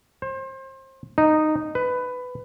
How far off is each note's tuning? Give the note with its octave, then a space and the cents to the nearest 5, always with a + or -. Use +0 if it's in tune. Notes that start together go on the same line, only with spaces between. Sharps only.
C5 +30
D#4 -10
B4 +15